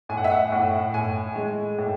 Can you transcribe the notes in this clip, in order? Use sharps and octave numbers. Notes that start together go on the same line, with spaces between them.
A2 G#5
F#5
E5
F#5
A2
A2 G#5
G#3
A2